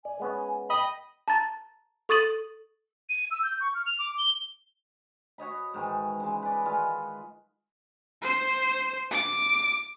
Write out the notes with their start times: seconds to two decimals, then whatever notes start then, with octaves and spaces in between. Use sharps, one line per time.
0.05 D5 G#5
0.20 G#3 B3 C#4
0.70 D#5 G5 B5
1.28 A5 A#5 A6
2.09 A4 C#6 D#6 A6 D#7 F#7
3.10 D#7
3.31 E6
3.43 G6
3.61 C#6
3.75 F6
3.87 F7
3.99 D6
4.18 G7
5.38 F#4 C#5 D#5 B5
5.74 G#2 D#3 E3
6.20 C#3 E3 G#3
6.43 B4 D5
6.65 D#3 G#3 F4 B4
8.23 C5
9.11 D6